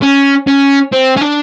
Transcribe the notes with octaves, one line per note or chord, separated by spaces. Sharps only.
C#4
C#4
C4
C#4
D4